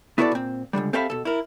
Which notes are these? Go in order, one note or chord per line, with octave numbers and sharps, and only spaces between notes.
B3 E4 F#4 A4 C#5 D5
A#2 C4
C#2 A#2 D3 G3
C4 G4 A4 E5 F5 B5
B2 A4
E4 A#4